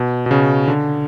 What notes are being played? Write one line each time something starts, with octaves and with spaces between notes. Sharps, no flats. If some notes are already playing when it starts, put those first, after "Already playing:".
Already playing: B2
B2
C#3
D3